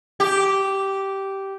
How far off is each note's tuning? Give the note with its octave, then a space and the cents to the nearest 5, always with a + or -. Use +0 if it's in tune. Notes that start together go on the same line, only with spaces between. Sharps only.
G4 -10